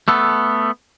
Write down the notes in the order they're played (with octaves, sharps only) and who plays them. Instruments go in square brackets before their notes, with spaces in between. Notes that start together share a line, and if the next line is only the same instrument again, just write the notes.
[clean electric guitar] A3 B3 A4